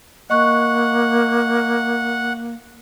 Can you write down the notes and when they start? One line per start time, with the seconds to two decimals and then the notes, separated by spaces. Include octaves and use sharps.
0.30 A#3 D#5 F#5 C#6 F#6